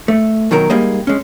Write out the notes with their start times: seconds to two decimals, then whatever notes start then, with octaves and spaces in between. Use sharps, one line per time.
0.08 A3
0.51 B2 D#3 F#3 A#4
0.70 G#2 G3 A#3 G#4 D#5
1.07 G#3 C#4